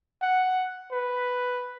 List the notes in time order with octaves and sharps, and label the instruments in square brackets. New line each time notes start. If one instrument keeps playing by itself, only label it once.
[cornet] F#5
B4